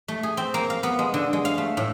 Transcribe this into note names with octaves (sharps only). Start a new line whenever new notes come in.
A3
G#4
C4
A#3
F5
B3
G#3
D3
G#3
F5
A3
A2